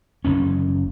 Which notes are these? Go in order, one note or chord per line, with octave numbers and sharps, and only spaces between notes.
F#1 E2 C#4